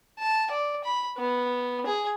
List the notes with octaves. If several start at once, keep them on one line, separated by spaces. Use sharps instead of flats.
A5
D5
B5
B3
G#4